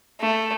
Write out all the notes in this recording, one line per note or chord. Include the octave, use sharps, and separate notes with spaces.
A3